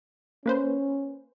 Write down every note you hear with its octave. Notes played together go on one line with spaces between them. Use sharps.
A#3 C#4 B4 C5